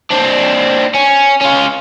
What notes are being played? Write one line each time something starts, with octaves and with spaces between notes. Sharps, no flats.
C4 D4
C#4
C#4 F4